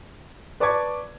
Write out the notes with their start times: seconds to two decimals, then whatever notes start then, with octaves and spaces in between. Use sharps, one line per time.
0.60 B4 D5 A5 C#6 D6 G#6